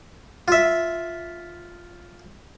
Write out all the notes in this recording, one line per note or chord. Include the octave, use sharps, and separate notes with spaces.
F4 E5